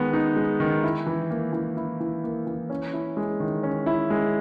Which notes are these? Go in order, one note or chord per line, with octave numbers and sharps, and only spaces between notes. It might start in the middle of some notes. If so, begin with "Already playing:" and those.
Already playing: D#3 G#3 B3
D#4
G#3
D#3
E4
E3
A#3
E3
E4
E3
A#3
E3
C#4
E4
G#3
D#3
C#4
E4
G#3